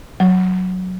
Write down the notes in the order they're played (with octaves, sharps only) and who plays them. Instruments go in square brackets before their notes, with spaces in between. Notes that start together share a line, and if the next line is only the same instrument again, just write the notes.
[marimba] F#3